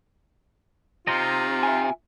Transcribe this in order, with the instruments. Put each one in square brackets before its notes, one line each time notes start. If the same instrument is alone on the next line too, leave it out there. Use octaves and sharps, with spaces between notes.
[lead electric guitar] C3 [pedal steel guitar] D#4 C5 D#5 [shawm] F4
[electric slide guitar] E5 G#5